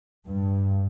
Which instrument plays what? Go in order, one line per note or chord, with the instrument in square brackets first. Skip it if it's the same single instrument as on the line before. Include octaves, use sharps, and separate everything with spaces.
[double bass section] G2